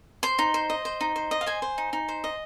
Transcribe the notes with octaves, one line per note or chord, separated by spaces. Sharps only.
C5 C6
D#4
C5
D#5
C5
D#4
C5
D#5
F5
C5 G#5
C5
D#4
D#4
C5
D#5